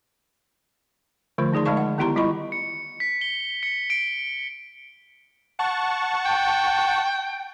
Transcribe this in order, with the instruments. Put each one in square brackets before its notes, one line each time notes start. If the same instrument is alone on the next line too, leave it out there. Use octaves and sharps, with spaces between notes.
[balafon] D3 F3 A3 F4 C5
D#3 D#4 G#4 D5 C6
D3 G#3 D5 F5 A5 C#6
F#5
D#3 B3 E4 G4 A#5 C6
G3 E4 F4 D#5 B5 C#6
[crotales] C#7
B6
G7
C#7
D7
[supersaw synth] F#5 A5 C#6
[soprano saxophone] G5